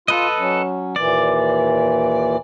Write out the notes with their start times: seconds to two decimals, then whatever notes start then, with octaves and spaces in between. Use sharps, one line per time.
0.08 F4 A4 B4 D#5
0.39 F#3 C#4
0.96 D#2 A#2 E3 D5